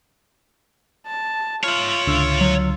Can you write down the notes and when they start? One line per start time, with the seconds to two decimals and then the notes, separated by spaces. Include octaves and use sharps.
1.06 A5
1.64 F4 C#5 E5 F6
2.07 C#2 D3 E6
2.41 F#3